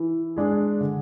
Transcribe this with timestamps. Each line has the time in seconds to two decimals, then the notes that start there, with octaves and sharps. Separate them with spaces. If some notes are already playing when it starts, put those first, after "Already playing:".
Already playing: E3
0.36 G#3 D4 G#4
0.80 D3